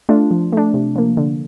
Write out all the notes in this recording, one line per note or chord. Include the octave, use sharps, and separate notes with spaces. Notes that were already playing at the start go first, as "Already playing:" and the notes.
A3 D4 F4
F3
A3 D4
C3
F3 A#3
D3